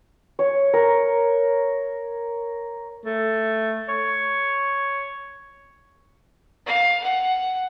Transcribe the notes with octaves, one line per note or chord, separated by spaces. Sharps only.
C#5
A#4
A3
C#5
F5
F#5